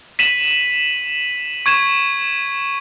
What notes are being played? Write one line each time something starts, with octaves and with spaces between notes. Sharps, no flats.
B6 D#7 E7 F#7
C#6 G#6 D#7 E7